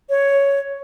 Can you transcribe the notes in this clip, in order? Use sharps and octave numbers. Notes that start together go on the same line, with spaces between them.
C#5